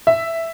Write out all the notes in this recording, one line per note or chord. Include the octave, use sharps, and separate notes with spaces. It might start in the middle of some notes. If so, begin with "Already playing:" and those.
E5